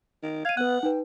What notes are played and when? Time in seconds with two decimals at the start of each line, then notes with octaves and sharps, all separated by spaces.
0.23 D#3
0.45 F5 G#6 D#7
0.57 B3 B4 F#5 F#6
0.83 D#4 B4 G5